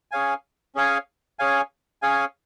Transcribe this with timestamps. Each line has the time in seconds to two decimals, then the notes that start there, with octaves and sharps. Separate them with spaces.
0.11 C#4 G#4 C#5 F5 G#5
0.75 C#4 G#4 C#5 F5 G#5
1.39 C#4 G#4 C#5 F5 G#5
2.02 C#4 G#4 C#5 F5 G#5